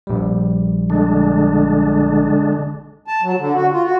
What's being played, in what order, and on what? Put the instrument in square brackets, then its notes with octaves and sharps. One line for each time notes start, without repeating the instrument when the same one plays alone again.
[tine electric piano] A#1 G3
[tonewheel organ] D3 G#3 D4
[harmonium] A5
F#3
D3
F#4
F4
F#4